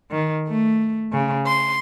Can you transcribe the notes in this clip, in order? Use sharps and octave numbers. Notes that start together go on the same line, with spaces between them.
D#3
A3
C#3
C6